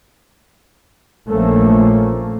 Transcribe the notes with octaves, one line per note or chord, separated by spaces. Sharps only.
A#1 F3 A3 A#3 C#4